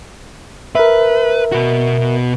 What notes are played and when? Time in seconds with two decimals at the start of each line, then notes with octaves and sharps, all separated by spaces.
0.75 A#4 B4 E5
1.52 B2 F#4